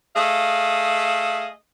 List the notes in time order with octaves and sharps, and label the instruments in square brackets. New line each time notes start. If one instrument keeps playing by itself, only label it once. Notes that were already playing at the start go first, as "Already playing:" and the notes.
[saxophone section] A3 G#4 D#5 F5